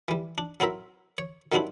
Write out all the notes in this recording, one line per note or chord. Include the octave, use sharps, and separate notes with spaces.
E3 G3
D4
F#3 C4 E4 A#4 E5
C#5
D#3 F#3 G3 C4 D4 E4